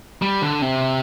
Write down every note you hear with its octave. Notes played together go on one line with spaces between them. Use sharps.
G3
D3
C3